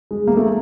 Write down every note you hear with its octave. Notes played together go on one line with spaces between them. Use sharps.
G#3
A#3
A3